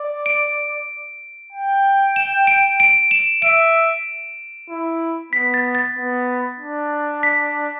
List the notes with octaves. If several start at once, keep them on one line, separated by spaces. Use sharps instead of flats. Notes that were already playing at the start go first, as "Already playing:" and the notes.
Already playing: D5
D7
G5
E7
D7
D7
E7
E5 D7
E4
B3 B6
A6
A6
B3
D4
B6